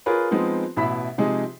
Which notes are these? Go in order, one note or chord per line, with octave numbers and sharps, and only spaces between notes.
F4 G#4 A#4 B4 C#5
F3 G#3 B3 C4 D#4
A1 B2 E4 E5 B5 B6
C3 F3 G#3 D#4 G#4